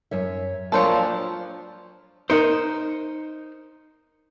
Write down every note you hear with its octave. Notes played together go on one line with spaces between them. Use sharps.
F#2 C#5 E5
A#2 F3 F#3 A#3 D4 A4 C5 C#5
D#4 A#4 C5 C#7